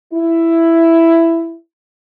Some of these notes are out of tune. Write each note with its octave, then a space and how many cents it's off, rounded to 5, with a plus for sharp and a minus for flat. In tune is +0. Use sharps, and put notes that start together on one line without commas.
E4 +10